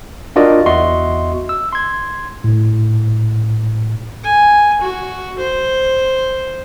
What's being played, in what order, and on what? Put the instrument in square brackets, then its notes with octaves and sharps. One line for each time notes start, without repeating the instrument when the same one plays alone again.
[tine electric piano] D4 F4 F#4 A#4 D5 D#5
E2 F#4 D#5 E5 C6 C#6
E6
C6 G#6
A2
[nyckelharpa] G#5
F#4
C5